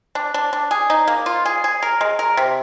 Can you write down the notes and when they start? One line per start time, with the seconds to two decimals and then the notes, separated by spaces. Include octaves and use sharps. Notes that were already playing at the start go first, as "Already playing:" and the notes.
0.15 D4
0.34 D4
0.53 D4
0.71 G#4
0.90 D#4
1.07 A#3
1.26 F4
1.45 G#4
1.64 G#4
1.82 A#4
2.01 G#3
2.19 A#4
2.37 C3